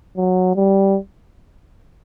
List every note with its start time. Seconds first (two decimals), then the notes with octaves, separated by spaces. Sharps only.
0.17 F#3
0.56 G3